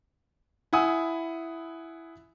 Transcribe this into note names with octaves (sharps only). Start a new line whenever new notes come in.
E4 F#5 G#5 D#6